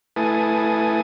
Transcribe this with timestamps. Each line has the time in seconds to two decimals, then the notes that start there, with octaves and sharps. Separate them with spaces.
0.16 A3 E4 B4 G#5 A5 D#6